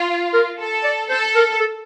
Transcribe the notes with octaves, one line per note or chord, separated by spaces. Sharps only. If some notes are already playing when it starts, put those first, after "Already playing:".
Already playing: F4
A#4
A4
D5
A4 C5
A#4
A4